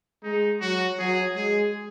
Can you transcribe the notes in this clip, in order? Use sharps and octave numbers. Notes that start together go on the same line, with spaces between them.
G#3 D#4
F#3 F#4
F#3 G#4
G#3 G#4